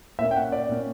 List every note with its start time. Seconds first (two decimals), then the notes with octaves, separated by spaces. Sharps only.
0.19 A#2 A#3 C#4 E5
0.31 G5
0.36 F#5
0.52 D5
0.69 A#2 A#3 C#4